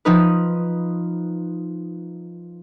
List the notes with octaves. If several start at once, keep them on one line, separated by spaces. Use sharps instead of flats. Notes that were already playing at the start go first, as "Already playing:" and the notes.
F3 D#4 B4